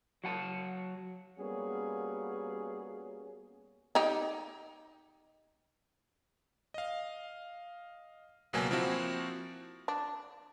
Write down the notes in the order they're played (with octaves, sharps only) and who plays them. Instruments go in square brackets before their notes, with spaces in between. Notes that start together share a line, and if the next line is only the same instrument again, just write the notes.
[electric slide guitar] F#3 F#5 A5
[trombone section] G3 A#3 B3 C#4 F#4 G#4
[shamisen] D#4 G4
[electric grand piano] D#5 F5
C#2 B2 F#3 A#3 G#5
F3 A#3 C4 E4 F#4
[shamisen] D4